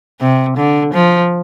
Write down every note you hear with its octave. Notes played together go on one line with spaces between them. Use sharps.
C3
D3
F3